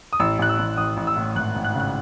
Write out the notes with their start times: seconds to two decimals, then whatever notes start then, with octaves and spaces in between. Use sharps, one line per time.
0.13 D#6
0.20 A1 E6
0.39 A1 F#6
0.49 E6
0.59 A1
0.77 A1 D#6
0.97 A1
1.07 E6
1.17 A2
1.36 G#1 F#6
1.55 G#1
1.65 F#6
1.74 C#3
1.80 F#6